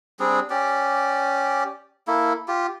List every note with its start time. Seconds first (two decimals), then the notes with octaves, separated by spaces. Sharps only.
0.20 G3 C4 D4 G#4
0.50 C#4 G4 D5
2.08 A#3 E4 A4
2.48 F4 G4